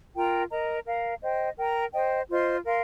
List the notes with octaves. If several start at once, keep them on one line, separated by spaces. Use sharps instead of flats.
F4 A#4 G5 A#5
A#4 D#5 A#5
A#4 F5 A#5
C5 D#5 G5
A#4 G5 A#5
C5 D#5 G5
F4 C5 D#5 C6
A#4 F5 C6